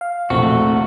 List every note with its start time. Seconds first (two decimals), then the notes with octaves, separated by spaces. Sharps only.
0.01 F5
0.30 E1 A#1 A3 C4 F#4